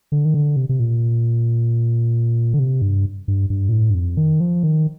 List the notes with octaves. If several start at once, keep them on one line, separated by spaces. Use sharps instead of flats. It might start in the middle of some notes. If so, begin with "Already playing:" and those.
D3
D#3
D3
C3
C3
A#2
D3
C3
G2
G2
G2
A#2
A2
G2
F2
D#3
F3
D#3